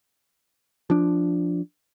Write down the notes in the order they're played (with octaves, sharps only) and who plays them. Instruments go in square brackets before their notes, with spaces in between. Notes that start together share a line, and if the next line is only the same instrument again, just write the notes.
[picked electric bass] F3 D4